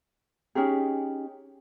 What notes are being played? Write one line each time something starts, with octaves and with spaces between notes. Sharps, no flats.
C#4 D#4 G4 G#4